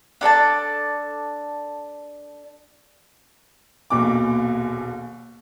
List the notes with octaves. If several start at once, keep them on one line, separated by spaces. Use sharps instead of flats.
D4 A4 D5 A5
D#1 A#1 B2 D6